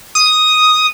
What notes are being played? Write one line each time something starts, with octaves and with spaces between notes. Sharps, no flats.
D#6